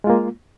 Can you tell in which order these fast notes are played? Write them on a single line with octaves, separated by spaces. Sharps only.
G#3 F4 A#3